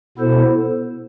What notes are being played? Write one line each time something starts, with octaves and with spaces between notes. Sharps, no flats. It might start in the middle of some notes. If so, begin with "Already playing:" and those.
B2 B3 E4 A4 C5